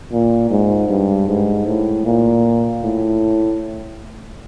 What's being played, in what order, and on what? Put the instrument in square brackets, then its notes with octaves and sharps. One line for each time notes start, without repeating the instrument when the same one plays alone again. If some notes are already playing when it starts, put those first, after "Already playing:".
[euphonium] A#2
G#2
G2
G#2
A2
A#2
A2